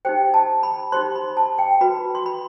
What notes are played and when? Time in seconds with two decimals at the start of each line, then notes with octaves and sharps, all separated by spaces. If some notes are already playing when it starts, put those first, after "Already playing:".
0.05 D#4 G4 C5 G5
0.34 A5
0.63 B5
0.92 D#4 G4 C5 C6
1.15 B5
1.37 A5
1.58 G5
1.81 F#4 B4 B5
2.15 C6
2.26 B5